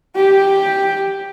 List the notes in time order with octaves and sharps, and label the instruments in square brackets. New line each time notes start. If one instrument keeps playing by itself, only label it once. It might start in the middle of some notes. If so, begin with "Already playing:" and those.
[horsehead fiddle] G4